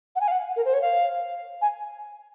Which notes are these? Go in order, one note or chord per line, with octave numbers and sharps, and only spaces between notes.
F#5
G#5
F5
F#5
A#4
C5
C#5
F5
G#5